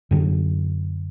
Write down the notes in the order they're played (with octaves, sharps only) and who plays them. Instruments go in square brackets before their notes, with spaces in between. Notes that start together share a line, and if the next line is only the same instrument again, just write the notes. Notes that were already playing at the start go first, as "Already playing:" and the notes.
[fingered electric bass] F#2 D3 F#3